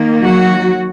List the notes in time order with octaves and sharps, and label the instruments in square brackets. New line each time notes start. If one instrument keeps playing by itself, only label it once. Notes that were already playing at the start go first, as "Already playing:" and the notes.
Already playing: [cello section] D#3 A#3
F#3 F#4